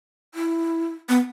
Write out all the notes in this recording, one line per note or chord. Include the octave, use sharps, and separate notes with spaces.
E4
B3